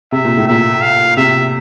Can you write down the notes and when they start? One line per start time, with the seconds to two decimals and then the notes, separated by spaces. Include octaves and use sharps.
0.12 C3 E5
0.25 A#2
0.37 A2
0.47 A#2 E5
0.81 F5
1.17 C3 E5